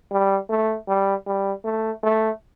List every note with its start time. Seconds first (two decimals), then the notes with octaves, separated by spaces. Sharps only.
0.12 G3
0.50 A3
0.88 G3
1.26 G3
1.65 A3
2.03 A3